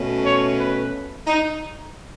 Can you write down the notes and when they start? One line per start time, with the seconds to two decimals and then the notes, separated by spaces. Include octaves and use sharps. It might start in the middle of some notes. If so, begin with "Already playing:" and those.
Already playing: B2 A3 C#4
0.24 C#5
0.58 B4
1.27 D#4